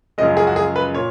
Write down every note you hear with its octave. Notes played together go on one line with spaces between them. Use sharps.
F#2 C#3 F3 G#3 D#5
G#4
F#4
G#4
B4
A#2 C#5